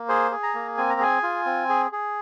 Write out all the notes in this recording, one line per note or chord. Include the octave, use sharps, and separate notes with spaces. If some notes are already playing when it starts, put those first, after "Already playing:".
Already playing: A#3
G#4 C5
G#4
A#5
A#3
C4 G#5
A#5
G#4 G#5
F4
C4
G#4
G#4